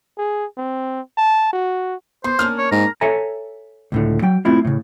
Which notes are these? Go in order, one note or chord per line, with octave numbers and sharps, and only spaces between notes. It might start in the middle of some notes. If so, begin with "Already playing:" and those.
G#4
C4
A5
F#4
B3 C5 C6
A#3 C#4 D4 F6
C#5
G#2 A#5
A4 C#5 E5 G#5 A#5
C#2 A2 D3
F#3 G5
A3 C4 E4 F4
A2 C#3